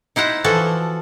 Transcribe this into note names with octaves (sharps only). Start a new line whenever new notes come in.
D#4 E4 C5 F#5
E3 F3 F#4 A4